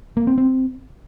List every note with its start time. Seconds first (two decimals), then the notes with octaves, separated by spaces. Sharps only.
0.17 A#3
0.27 C4
0.38 C4